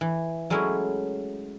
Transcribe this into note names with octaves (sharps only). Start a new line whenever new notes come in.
E3
F#3 G#3 A3 C#4 E4